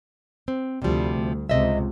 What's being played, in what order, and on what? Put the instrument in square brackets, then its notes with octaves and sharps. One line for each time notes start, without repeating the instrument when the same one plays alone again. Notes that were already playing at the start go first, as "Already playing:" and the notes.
[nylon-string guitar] C4
[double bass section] D2 G3 [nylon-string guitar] C3 F3
[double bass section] D2
[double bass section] C#2 C3 [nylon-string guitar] D#5 E5